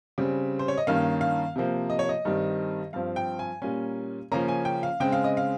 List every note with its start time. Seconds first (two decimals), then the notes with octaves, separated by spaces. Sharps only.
0.18 C#3 G3 C4
0.59 C5
0.68 C#5
0.78 D#5
0.87 G2 D#3 A#3 C#4 F5
1.21 F5
1.56 C3 F3 A#3
1.90 D#5
1.99 C#5
2.09 D#5
2.25 G2 D#3 G3 C4
2.93 G2 F3 C4 F5
3.16 G5
3.39 G#5
3.62 A#2 G3 A#3 C#4 G#5
4.32 C#3 F3 A#3 C#4 A#5
4.48 G#5
4.65 G5
4.83 F5
5.00 C#3 G#3 C4 G5
5.12 F5
5.24 D#5
5.37 F5